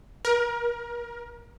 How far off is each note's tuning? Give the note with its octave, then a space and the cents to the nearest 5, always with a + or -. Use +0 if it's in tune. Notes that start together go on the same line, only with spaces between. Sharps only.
A#4 +30